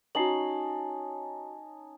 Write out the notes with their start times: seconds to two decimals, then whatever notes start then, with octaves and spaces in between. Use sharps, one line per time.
0.15 C#4 D#4 F#4 A5 C7 F#7